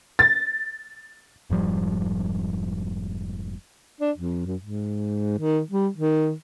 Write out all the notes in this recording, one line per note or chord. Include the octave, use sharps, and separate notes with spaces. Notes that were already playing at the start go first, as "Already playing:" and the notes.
A6
F1 G#2 F3 G3
D4
F2
F#2
G#2
D#3
G3
D#3